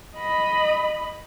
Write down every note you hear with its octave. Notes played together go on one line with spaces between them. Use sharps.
D#5 B5